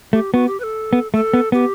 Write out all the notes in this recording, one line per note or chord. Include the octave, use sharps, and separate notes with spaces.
A3 G4
B3 F#4
G4
B4
A4
B3
A3 A4
B3
B3 G4